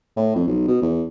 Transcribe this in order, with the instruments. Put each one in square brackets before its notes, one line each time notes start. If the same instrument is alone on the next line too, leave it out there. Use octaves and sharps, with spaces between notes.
[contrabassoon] A2
F2
B1
B2
E2